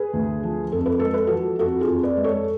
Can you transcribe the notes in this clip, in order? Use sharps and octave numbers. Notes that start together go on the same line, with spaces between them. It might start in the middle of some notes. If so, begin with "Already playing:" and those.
Already playing: G#4 B4
D2
F3
F2 A4
B4
G#3 A4
B4
F3 F#4 A4
F2 F#4 A4
F4 G#4
F2
B4 D5
G#3
A4 C#5